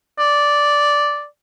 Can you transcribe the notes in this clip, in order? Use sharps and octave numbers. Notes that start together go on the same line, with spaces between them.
D5